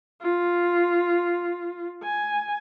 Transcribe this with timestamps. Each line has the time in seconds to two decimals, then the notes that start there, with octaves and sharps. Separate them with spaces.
0.22 F4
2.03 G#5